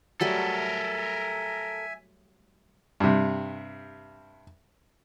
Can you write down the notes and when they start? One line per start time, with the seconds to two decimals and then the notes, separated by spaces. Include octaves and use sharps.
0.21 F#3 G3 A3 A4 A#4 E5 G#5
3.00 G2 C3